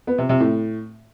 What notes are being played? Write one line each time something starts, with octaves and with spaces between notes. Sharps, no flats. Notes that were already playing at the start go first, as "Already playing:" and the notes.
B3
C3
C3
A2